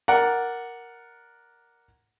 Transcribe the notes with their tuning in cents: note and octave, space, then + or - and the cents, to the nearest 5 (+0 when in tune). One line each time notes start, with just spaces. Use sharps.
A#4 +5 D5 +0 F#5 +0